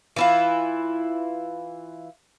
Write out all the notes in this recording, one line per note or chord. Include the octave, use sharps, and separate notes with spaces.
E3 E4 F4